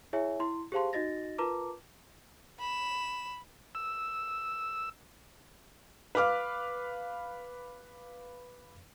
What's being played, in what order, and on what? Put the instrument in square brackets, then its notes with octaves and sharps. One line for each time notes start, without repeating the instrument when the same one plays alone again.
[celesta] E4 G#4 C#5 E5 G#5
E4 C6
G4 G#4 C5 F5 A5 C6
D#4 F#4 D#5 A6 A#6
F4 A#4 B4 A5 A#5 D6
[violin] B5 E7
[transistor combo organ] E6
[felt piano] B4 F5 D6 F6